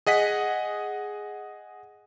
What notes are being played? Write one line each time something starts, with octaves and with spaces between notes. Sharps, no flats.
G#4 D#5 F#5 B6